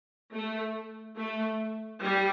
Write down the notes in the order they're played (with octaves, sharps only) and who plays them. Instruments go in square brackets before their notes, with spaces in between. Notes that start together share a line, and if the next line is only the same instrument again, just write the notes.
[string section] A3
A3
G3